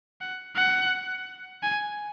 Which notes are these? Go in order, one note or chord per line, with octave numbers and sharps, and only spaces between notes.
F#5
F#5
G#5